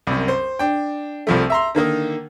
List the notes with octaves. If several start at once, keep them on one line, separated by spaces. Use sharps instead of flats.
C2 F#2
C5
D4 G5
C2 F3 A3
E5 A#5 C6
D3 D#3 A#3 D#4